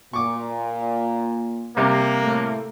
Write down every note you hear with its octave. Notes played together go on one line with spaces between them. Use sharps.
A#2 C#6 D6
C3 G3 A#3
A2 A3